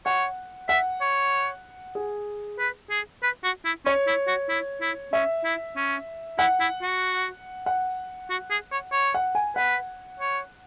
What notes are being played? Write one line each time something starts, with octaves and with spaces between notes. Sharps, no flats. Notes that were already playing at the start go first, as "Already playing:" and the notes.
C#5 F#5
E5 F#5
C#5
G#4
B4
G#4
B4
F#4
E4
C#4 C#5
E4
F#4
E4
E4
C#4 E5
E4
C#4
E4 F#5
E4
F#4
F#5
F#4
G#4
C#5
C#5
F#5
G#5
B4 F#5
C#5